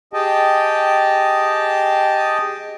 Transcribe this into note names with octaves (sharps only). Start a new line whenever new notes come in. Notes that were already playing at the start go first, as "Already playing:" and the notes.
G4 G#4 D#5 G5 A5